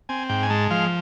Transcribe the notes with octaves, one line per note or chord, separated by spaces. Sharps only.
C4 G#5
G#2 G5
G#5
G#3 A5
F3 F5